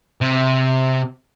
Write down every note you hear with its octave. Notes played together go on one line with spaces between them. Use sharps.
C3